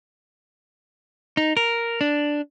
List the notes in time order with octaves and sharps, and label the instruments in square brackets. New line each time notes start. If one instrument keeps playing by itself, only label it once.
[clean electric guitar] D#4
A#4
D4